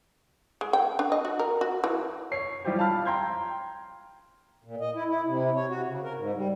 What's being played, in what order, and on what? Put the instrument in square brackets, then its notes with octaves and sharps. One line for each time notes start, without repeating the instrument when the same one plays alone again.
[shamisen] G#3
G5
D4
D#5
F#4
A#4
F#4
E3
[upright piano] C#5 C7
F3 G3 E4 F4 G4 C5
F5 A5 B5 F6
G5 A#5 C6 G6 G#6
[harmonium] A#2
D#5
E4
E4
C3
C#5
F#4
C#3
A#4
G#2
G3